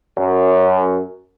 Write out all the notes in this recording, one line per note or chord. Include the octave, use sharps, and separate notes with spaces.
F#2